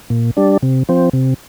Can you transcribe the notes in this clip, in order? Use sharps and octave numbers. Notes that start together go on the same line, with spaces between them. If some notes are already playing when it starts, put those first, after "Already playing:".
A#2
G3 D4
C3
F3 C4
C3